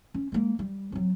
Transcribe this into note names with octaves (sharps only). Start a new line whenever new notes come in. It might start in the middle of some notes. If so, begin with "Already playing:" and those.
C#4
G#3 A#3
G3
F#3 C4